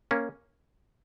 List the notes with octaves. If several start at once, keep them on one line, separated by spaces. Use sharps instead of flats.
A#3 C#4